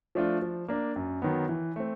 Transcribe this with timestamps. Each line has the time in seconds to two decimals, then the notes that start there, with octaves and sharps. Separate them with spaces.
0.15 F3 A3 D4 F4
0.42 F3
0.68 A#3 D4
0.96 F#2
1.22 D#3 F#3 B3
1.49 E3
1.76 A3 C4